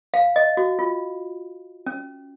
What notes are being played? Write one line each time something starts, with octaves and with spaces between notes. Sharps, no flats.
F5
D#5
F#4
F4
C#4